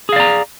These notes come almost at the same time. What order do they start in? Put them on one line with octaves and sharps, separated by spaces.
G#4 F5 D5 A#5